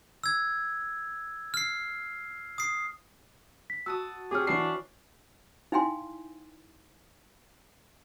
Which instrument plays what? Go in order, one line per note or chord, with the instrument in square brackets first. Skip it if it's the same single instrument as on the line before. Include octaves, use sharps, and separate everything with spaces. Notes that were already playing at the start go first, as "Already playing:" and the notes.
[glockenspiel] E6 G#6
F6 C7
D#6 C7
[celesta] B6
[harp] F#4 A5 D#6 [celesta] E6
[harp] C4 C#5 [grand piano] G4 [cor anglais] G#4 [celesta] D6 F6
[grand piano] E3 F#4 C7 [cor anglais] D4 [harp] B5 C#6
[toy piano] D#4 E4 F5 G5 G#5 C6